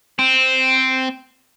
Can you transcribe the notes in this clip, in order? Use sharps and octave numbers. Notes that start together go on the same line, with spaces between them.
C4